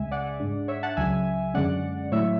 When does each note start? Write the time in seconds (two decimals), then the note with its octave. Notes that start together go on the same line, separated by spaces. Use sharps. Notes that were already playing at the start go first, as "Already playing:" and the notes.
Already playing: C#2 C#3 G#3 E5 G#5
0.11 D5 F#5
0.40 G#2 G#3 D4
0.68 C#5 E5
0.83 F#5 A5
0.97 C#2 C#3 F#3 E5 G#5
1.54 F#2 D3 G#3 C#4 D5 F#5
2.12 A2 F#3 A3 E4 C#5 E5